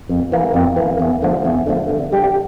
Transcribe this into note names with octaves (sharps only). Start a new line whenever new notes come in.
F2
E3 A#3
F2
E3 A#3
E2
D3 F3 A3
E2
D3 F3 A3
D3
G3 D4 G4